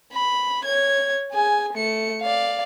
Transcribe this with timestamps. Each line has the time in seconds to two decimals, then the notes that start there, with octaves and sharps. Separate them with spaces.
0.13 B5
0.65 C#5 G#6
1.32 G#4 G#5
1.73 A3 C#7
2.22 D5 F5